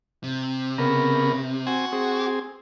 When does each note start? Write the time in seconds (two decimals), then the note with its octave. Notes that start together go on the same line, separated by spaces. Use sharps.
0.24 C3
0.78 C#3 B3 A#4
1.67 C4 F#4 G#5
1.92 C4 G#4